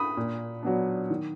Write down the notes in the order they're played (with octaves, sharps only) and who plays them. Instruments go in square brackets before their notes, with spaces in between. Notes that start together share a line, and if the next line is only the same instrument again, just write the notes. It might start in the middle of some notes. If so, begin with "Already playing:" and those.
Already playing: [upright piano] B5 D#6
A#2
F#3 B3 D4
D#3